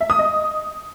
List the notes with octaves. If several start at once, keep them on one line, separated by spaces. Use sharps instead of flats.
E5
D#6
D#5